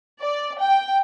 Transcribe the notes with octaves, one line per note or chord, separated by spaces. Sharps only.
D5
G5